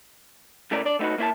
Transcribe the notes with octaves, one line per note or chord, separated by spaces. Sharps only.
C#3 A3 E4 A#4 D5
D4 D5
A3 B3 D#4 F#4 B4
A#3 E4 C5 A5